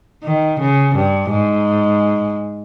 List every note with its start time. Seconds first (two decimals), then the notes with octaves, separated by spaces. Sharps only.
0.24 D#3
0.59 C#3
0.95 G2
1.31 G#2